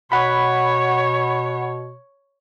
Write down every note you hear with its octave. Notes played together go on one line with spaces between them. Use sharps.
B2 C#5 F#5 B5